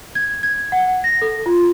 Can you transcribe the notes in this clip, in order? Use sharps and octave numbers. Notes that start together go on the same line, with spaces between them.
G#6
G#6
F#5
A#6
A4
F4